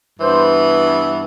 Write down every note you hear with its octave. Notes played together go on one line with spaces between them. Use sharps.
G2 E3 B3 C5